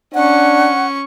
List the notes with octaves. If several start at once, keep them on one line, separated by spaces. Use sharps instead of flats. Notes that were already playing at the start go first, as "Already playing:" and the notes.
C#4 D4 F#5 C#6